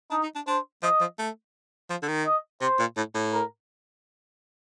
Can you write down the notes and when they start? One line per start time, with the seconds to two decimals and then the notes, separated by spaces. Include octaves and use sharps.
0.11 D4 D#4
0.23 D#4
0.36 D4
0.47 D4 C5
0.83 F3 D#5
1.01 F3
1.19 A3
1.90 F3
2.03 D3
2.08 D#3
2.26 D#5
2.61 C3 C5
2.79 A#2
2.97 A2
3.15 A2
3.33 A#4